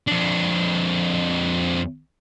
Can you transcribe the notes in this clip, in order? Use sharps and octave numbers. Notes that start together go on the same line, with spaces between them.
F2 D4